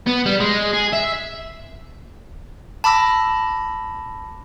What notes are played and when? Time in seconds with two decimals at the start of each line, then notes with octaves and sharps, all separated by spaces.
0.07 B3
0.26 G3
0.40 G#3
0.73 G#4
0.93 E5
2.84 A5 B5 D6 E6 A#6